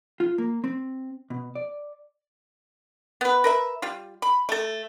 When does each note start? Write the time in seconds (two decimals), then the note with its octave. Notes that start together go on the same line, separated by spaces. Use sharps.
0.20 F4
0.38 A#3
0.64 C4
1.30 B2
1.55 D5
3.21 B3 B4
3.44 A#4 B4 E5
3.82 G3 F4
4.22 B5
4.49 A3 A4